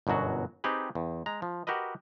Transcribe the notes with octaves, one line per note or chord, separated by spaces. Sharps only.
G1 F#2 B2 F#3 F#4
C4 D#4 G4 G#4 B4
E2
G#3 A#5
F3
F#4 G4 A#4 B4 D#5